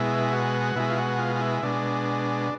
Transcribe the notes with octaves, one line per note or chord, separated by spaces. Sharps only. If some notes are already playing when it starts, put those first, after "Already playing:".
Already playing: B2 G#3 E4
F#4
B2 G#3 E4
F4
F#4
F4
F4
E4
B2 G#3 D4